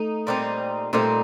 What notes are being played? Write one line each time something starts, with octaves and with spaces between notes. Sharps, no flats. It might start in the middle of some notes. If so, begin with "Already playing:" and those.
Already playing: A3 D#4
A#2 G3 C4 D#4
A#2 G3 A3 C4 D#4